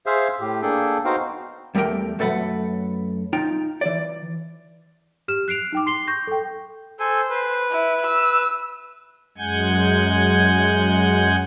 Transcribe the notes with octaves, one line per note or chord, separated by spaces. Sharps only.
G#4 C5 E5 F5
A2 G4
A#3 D4 G#4 A4 G5
B3 D#4 F#4 C5 F5 G5
E2 G3 A3 A#4 G5
F#2 A3 A4 B4 F#5 B5
D#4 F4 G5
E3 D5
G4 F6 E7
F#6 C7 D7 F7
D#4 G5 D6
C6 C7 G7
C#6 G6 A#6
A4 G5
A4 C5 G#5
B4
E4
E6
F#2 G#3 F#5 G#5 G6 G#6